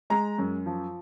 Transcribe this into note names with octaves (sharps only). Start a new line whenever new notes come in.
G#3 A#5
F#2
F3